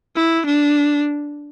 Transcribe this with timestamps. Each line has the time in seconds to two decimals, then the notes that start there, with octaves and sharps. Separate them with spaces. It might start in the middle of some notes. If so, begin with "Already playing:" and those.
0.16 E4
0.46 D4